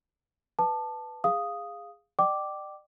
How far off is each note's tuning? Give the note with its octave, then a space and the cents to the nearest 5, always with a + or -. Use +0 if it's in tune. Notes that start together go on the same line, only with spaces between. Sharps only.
B4 +5 A5 +0 D6 +40
G#4 -15 F5 +0 D#6 +0
D5 +40 G5 -25 D6 +0